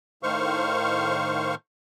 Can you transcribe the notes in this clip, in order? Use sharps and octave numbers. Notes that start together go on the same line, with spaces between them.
A2 D#3 C5 F5 C#6